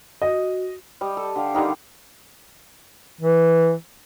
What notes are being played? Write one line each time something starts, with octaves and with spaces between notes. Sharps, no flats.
F#4 D#5
G3 D#5
A4
D3 G4 F5
D3 D#3 G3 D#4
E3